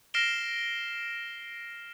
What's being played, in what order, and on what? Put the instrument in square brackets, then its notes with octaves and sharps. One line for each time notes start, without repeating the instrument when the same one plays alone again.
[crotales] F6 A#6 C7 D7 E7 G7